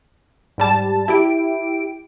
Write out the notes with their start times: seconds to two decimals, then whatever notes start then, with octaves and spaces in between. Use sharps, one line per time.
0.58 G#2 G3 A5
1.08 E4 G4 D7